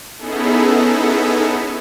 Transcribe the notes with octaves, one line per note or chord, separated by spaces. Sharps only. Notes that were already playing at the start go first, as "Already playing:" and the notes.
B3 C#4 D#4 E4 G#4 A4